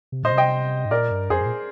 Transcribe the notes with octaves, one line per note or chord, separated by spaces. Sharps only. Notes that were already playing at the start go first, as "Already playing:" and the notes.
C3
A#2 C5 D#5
C3
D#5 G5
G#2
A#2 A#4 D5
G2
F2 G#4 C5
G2
A#2